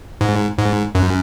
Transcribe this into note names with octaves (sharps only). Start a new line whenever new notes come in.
G#2
G#2
F#2